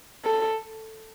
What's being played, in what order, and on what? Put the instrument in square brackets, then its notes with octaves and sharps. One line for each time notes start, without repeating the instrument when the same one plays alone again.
[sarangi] A4